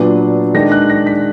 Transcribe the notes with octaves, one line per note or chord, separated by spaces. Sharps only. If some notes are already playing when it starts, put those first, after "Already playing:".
Already playing: A#2 F#3 B3 D4
D#3 G#3 D4 A#6
F#6
A#6
B6